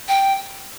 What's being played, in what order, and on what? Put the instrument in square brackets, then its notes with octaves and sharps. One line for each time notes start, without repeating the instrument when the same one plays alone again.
[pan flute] G5